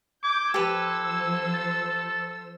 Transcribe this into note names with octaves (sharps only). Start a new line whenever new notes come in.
D6 G6 G#6
F3 G4 A4 B4 C5 E6
A6